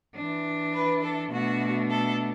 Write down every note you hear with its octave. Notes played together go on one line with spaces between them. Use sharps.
E3 D4
B4
A4
B2 A3 D4 F#4
A4